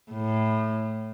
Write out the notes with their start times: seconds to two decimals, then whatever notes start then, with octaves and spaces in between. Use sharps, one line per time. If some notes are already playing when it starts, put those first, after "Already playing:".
0.11 A2